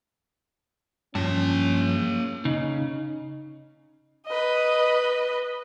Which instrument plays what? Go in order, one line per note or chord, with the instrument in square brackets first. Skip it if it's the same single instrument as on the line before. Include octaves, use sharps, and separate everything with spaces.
[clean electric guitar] G2 F3 [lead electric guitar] A#3 A5 [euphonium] C#4
[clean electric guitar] C#3 [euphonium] D#4
[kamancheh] B4 D#5